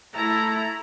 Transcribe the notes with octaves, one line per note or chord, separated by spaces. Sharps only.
A3 E4 A4 A#5